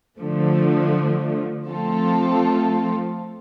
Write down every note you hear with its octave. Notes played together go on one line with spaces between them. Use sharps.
D3 F3 A3
F3 A3 C4 F4 A4